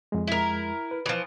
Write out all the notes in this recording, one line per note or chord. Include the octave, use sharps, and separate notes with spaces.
F2 G#3
E4 A#4
B4
E3 F3